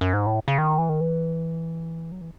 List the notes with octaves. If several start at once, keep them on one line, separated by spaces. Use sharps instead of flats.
F#2
G#2
A2
C#3
D#3
E3
D#3
E3
F#3
E3